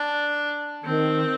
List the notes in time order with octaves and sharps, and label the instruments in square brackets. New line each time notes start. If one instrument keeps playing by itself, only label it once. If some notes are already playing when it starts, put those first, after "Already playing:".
Already playing: [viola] D4
[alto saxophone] D#3 [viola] C4